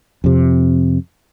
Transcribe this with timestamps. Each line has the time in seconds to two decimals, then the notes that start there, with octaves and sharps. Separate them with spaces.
0.24 F2 C3